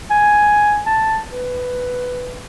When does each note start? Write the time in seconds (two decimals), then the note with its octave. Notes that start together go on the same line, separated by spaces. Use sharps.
0.11 G#5
0.86 A5
1.29 B4